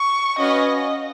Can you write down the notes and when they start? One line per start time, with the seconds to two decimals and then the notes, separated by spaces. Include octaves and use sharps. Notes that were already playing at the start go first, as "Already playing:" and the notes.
Already playing: C#6
0.39 C#4 F#4 B4 D#5 F5 G#5